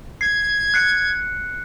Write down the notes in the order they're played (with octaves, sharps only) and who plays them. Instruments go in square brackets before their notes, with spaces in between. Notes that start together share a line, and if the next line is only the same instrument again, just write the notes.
[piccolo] G#6 [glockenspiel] C7
[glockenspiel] F#6 C7 C#7